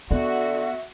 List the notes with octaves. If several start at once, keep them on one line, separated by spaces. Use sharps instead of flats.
D3 B3 F#4 E5